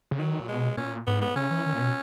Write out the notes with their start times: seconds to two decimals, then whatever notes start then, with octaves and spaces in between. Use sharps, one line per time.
0.11 C#3
0.18 D#3 F#3
0.40 A#2
0.48 B2 G#3
0.77 A#2 C#4
1.07 G#2 B3
1.22 B3
1.35 C#3 C#4
1.51 E3
1.66 D#3
1.73 A#2
1.80 B2